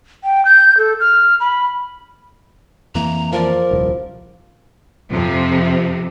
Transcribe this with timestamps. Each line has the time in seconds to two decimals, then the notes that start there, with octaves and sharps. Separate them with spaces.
0.24 G5
0.45 G6
0.78 A4
1.00 F6
1.40 B5
2.95 F2 E3 A#3 A#5
3.32 F3 A#4 D5
3.71 D#1 C2
5.10 F2 C3 F3